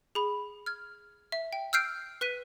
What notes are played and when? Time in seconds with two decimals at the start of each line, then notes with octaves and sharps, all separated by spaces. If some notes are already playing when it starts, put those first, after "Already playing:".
0.15 G#4 B5
0.66 F6 G#6
1.32 E5
1.53 G5
1.73 E6 F6 G6 C7 D7
2.21 B4 F#6 B6 D#7